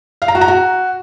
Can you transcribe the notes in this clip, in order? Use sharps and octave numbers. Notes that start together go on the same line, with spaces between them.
F5
A#5
F#4
A#5
F#4